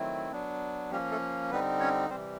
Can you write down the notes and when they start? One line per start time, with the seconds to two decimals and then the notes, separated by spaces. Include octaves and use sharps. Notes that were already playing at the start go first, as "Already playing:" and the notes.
Already playing: D#3 F#3 A3 C4 E4
0.32 F#3 B3 D4
0.91 F3 G3 A#3 C#4 G4
1.11 A3 A4
1.51 D3 G3 B3 C4 D#4 B4
1.80 C#4 C#5
2.10 C3 E3 G3 C4 C5